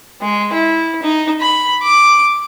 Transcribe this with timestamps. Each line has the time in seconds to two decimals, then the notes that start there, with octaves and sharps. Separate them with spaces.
0.21 G#3
0.53 E4
1.03 D#4
1.41 B5
1.83 D6